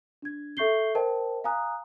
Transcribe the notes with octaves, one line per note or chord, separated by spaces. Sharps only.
D4 G#6
A4 E5 C#6 G6 C7 G7
A#4 C5 D#5 G5 A5
F5 G#5 A#5 D#6 F#6